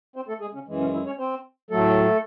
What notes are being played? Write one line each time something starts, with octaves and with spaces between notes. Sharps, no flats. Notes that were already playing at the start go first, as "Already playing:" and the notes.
C4 C5
A3 A4
G#3 G#4
C#3 C#4
F#2 E3 G#3
C#3 C#4
E3 E4
C#4 C#5
C4 C5
A2 F#3 A3 A4